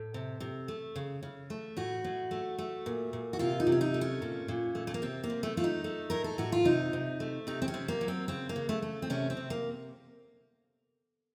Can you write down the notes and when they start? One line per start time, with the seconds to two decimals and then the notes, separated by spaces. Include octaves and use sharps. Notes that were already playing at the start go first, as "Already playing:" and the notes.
Already playing: A2 A4
0.14 C3
0.40 C3
0.68 A3
0.96 C#3
1.23 C#3
1.50 A3
1.77 A2 F#4
2.04 A2
2.31 A3
2.58 A3
2.86 A#2
3.13 A#2
3.33 F#4
3.39 C3 F4
3.60 D#4
3.67 C3
3.72 C#4
3.81 D#4
3.94 A3
4.01 C#4
4.22 A#2
4.48 A#2
4.75 A3
4.87 A3
4.94 A#3
5.02 C3 C4
5.24 A#3
5.30 C3
5.43 A3
5.57 A3 F4
5.64 D#4
5.84 A3
6.10 A2 A#4
6.24 A4
6.38 A2 F#4
6.52 F4
6.65 C3 D#4
6.93 C3
7.20 A3
7.47 C3 D#4
7.62 C4
7.68 C#4
7.74 C3
7.88 A#3
8.01 F#3
8.08 C4
8.28 C#3 C4
8.49 A#3
8.56 C#3
8.69 A3
8.82 A3
9.02 C4
9.10 C3 C#4
9.30 C4
9.37 C3
9.50 A#3